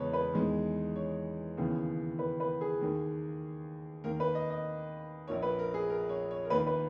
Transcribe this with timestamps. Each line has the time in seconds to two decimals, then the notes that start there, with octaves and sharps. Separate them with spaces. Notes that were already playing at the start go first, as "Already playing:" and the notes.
Already playing: E2 C#3 G#3 B3 B4 C#5
0.13 B4
0.34 E2 D#3 G#3
0.96 C#5
1.57 D#2 C#3 E3 B3
2.19 B4
2.40 B4
2.61 G#4
2.81 D#2 D#3 A#3
4.04 D#2 D#3 A#3 A#4
4.20 B4
4.35 D#5
4.50 D#5
5.28 A#1 A#2 A#3 C#5
5.42 B4
5.59 A#4
5.74 G#4
5.90 A#4
6.09 C#5
6.31 C#5
6.45 A#4
6.50 D#2 D#3 A#3 B4
6.67 B4